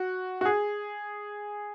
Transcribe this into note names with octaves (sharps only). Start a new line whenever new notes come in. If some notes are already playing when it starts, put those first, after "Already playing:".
Already playing: F#4
F#4
G#4